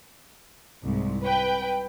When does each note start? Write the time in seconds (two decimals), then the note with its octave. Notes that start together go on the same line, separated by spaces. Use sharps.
0.84 C2 G#2
1.24 B4 G5